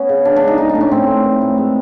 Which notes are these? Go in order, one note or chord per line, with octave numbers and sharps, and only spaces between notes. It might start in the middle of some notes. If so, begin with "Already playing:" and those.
Already playing: B3 C#4
C#3
C#3 D4
D4
G#3
D#4
A2 D#4
D4
A2
C#4
A2 C4
A2
E3
A2
G#3